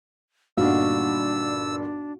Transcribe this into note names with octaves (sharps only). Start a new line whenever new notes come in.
G1 G2 A#2 D4 D#4 F#4 F5 E6